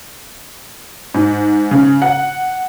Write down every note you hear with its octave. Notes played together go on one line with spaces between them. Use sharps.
G#2
C#3
F#5